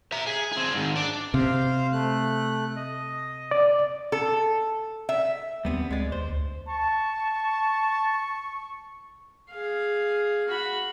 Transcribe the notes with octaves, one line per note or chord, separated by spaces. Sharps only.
E5 A#5
G#4
C4 G#4
G#2 D#3
D4 D5
C3 C5 F5
A3 F#6
D#5
D5
A4
E5
D#2 G3 B3 C4
D2 G#3 D5
D#2 C5
D2
A5 C#6
G#4 F5
F#4 B5